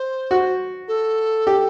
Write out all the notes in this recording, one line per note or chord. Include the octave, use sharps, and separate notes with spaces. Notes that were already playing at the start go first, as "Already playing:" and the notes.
Already playing: C5
F#4
A4
G4